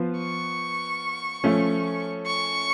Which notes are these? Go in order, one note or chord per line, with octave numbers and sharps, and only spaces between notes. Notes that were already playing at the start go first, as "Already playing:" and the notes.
Already playing: F3 B3 F4
C#6
F3 A3 C#4 F4
C#6